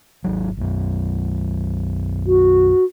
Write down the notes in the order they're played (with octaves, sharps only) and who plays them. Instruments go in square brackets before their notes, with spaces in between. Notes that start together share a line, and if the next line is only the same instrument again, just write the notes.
[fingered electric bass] G#1 F#3
B1 F#2
[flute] F#4